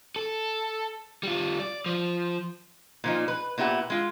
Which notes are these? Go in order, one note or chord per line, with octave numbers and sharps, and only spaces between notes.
A4
G3 F4
D5
F3
A#2 F3 D#4
B4
A#2 B3 E4 G4 F#5
G#3 F4